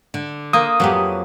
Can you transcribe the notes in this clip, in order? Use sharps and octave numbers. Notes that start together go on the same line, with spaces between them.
D3
A#3 C5 D#6
F2 F#3 B3 G4